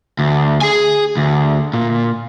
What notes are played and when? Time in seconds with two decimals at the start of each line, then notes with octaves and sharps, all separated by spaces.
0.19 D2
0.62 G#4 G#5
1.17 D2
1.74 A#2